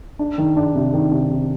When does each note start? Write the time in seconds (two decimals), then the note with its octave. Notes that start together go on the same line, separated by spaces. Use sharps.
0.19 D4
0.38 D#3
0.56 D4
0.75 C3
0.93 D#3
1.11 C3
1.30 C3